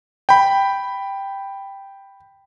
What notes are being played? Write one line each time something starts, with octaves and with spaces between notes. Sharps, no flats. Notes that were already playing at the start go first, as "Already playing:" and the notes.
G5 B5